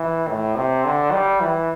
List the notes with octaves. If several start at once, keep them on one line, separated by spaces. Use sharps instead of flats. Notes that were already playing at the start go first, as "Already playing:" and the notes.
Already playing: E3
A2
C3
D3
G3
E3